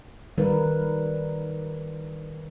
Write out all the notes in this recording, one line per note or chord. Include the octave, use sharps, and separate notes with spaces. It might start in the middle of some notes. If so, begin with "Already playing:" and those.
D#3 G3 A#4 B4